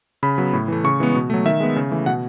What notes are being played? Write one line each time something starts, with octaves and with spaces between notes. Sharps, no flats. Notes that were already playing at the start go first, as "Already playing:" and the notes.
C#3 B5
F#3 B3
A2
E3 A3
C#3 C#6
E3 G#3 B3
B2
F#3 A3
D#3 E5
G#3 B3
C#3
E3 A3
B2 F#5